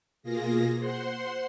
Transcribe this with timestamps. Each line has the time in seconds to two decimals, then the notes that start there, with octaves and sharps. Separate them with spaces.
0.23 B2 A#3 F4 G#4 A#6
0.79 C5 F#5 C6